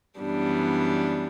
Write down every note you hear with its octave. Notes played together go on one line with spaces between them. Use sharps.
F#2 E3 G3 B3 D4